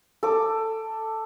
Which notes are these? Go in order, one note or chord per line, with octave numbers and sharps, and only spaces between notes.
A4 D6